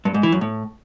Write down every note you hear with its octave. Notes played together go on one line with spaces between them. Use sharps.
G2
G#2
E3
F#2
A2